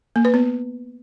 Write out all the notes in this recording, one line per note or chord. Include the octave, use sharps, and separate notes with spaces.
A#3
B4
B3